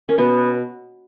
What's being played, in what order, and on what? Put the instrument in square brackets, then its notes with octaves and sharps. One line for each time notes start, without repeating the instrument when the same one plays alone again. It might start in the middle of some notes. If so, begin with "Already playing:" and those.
[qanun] C#4 [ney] A#4
[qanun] B2 B3 [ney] B4